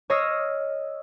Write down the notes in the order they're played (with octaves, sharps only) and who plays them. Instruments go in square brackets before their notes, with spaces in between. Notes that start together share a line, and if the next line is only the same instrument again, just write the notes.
[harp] C#5 D#5 E6 F6 A#6 C7